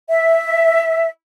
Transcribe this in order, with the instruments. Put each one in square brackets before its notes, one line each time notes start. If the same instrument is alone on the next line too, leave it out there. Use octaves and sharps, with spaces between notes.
[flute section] E5